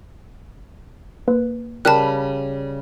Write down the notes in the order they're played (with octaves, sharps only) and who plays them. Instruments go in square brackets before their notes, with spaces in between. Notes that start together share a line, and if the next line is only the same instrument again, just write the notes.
[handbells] A#3 B4
[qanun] C#3 G3 B5 [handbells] A#4 G5 F6 [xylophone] A5 F#6